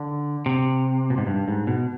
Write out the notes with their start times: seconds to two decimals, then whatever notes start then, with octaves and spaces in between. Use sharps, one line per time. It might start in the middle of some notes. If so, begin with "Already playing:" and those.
Already playing: D3
0.46 C3
1.10 B2
1.18 G#2
1.27 G2
1.48 G#2
1.67 B2